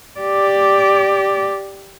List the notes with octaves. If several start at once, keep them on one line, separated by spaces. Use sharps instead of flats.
G4 D5